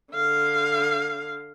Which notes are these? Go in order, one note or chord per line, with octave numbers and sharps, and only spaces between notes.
D3 F5